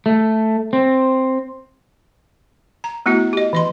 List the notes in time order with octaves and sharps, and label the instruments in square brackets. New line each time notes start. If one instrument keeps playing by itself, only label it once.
[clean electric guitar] A3
C4
[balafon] A#5
A3 B3 E4 F#4
G4 D#5
E3 D#5 C6